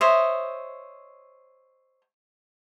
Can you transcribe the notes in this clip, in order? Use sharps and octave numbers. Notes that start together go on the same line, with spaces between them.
C5 C#5 D#5 E5